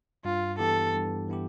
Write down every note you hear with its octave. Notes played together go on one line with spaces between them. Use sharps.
G2 F4
E3 B3 E4 G4 A4
G2
E3 B3 E4 G4